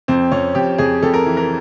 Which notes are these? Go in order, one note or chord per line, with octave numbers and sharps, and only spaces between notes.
F2 C4
F2 C#4
F2 G4
F2 G#4
F2 A4
A#4
E3
A#4